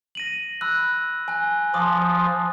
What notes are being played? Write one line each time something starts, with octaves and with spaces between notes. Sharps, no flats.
A#6 D#7 F#7
B5 E6 F#6
G#5 F#6
F3 C6 D6 D#6